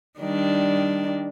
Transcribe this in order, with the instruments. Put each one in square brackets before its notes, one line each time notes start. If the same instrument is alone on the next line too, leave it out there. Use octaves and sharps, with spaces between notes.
[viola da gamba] D#3 G3 D4